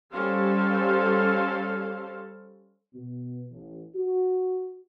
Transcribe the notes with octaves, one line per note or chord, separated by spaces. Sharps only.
G3 C#4 A4 C5 F5
B2
A1
F#4